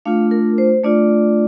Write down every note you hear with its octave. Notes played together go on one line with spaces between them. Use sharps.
A3 D4 F4 F5
A#4
C5
A3 D4 F4 D5